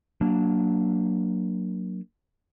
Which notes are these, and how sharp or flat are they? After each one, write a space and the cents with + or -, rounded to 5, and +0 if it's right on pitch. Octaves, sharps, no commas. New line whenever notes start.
F#3 +0 A#3 +0 D4 +0